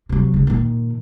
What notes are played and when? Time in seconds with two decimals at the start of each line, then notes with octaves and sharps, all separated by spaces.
0.09 C3 F#3
0.34 C#3 G#3
0.47 A#2 D#3